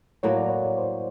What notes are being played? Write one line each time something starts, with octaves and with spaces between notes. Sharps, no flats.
A2 F#3 A#3 C#5
D5
C#5
C5